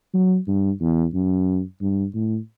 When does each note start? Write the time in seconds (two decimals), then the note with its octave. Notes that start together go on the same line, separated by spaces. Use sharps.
0.13 F#3
0.47 G2
0.81 E2
1.14 F#2
1.81 G2
2.14 A2